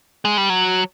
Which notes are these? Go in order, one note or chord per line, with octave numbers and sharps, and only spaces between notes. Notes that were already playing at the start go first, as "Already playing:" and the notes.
G#3
G3
F#3